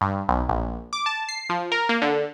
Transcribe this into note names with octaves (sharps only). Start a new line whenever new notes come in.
G2
B1
A#1
D6
A5
C7
F3
A#4
A#3
D3